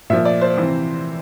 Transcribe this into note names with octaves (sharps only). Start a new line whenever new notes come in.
A#2 F3 E5
D5
C5
C3 E3